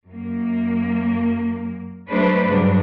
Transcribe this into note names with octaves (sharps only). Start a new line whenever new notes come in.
F#2 A#3
F#3 G#3 A3 D4 B4 C5
G2 C#3 F#3 D4